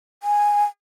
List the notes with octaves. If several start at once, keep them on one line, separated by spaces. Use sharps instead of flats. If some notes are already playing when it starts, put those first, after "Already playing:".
G#5